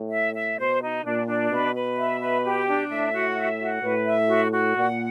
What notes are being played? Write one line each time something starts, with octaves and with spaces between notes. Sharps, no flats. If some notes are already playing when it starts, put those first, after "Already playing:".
Already playing: A2
E5
E5
B2 C5
D#4
A#2 D4
D4
B2 B4
B4
E5
B4
G4
D4
A2 E5
F#4
E5
F#4
A2 B4
E5
F#4
F#4
A#2 F#5